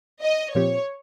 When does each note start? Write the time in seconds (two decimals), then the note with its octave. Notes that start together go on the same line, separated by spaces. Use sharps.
0.22 D#5
0.55 A#2 F3 C4 G4 C#5